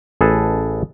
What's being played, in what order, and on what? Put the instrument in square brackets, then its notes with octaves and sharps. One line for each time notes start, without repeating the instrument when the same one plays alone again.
[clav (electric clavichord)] A1 G#4 A4 B4 A5